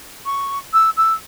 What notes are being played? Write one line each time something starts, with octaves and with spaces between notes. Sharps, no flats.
C#6
E6
E6